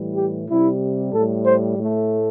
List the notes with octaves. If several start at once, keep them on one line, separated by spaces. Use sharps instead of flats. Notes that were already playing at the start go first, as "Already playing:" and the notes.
Already playing: A2 E3 G3
G4
C3 G3 E4
A2 G3 A4
C5
A2 A3